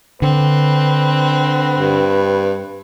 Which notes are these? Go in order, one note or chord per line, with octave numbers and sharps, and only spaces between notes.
D3 C4 B4
G2